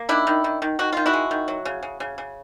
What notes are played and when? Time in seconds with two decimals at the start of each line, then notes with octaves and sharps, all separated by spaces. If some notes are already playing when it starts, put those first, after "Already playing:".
Already playing: A#3
0.09 D#3 D4 E4
0.27 D#3
0.44 D#3
0.62 D#3
0.79 D#3 F#4
0.93 D#3 F4
1.06 E4 F#4
1.13 G#3
1.31 D#3
1.48 F#3
1.65 C#3
1.83 C#3
2.00 C#3
2.18 C#3